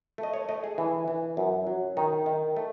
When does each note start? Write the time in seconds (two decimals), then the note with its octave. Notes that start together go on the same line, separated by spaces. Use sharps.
0.18 A3
0.23 D#5
0.34 C#5
0.49 A3 D#5
0.64 G#4
0.78 E3
1.08 E3
1.37 F#2
1.67 F#3
1.97 D#3 D#4
2.26 D#3
2.56 A3